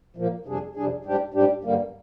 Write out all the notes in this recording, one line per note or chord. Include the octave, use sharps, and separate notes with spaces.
A#2 F3 A#3
F2 C3 G3 D4 G#4
F2 C3 G3 D4 G#4
G#2 G3 D4 G4
G#2 G3 D4 G4
G2 D3 G3 A#3